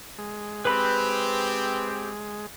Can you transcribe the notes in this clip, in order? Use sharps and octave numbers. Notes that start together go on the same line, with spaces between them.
G#3
C4 G4 B4 B5